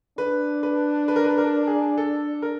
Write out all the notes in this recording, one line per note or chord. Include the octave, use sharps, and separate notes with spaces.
D4 B4
B4
B4
A#4
B4
A#4
G#4
A4
A#4